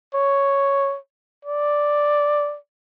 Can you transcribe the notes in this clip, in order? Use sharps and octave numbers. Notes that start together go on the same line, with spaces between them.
C#5
D5